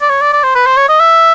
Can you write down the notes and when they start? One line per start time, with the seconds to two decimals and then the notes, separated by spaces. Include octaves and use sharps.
0.01 D5
0.10 C#5
0.21 D5
0.33 D5
0.43 C5
0.55 B4
0.66 C5
0.77 C#5
0.89 D#5
1.00 E5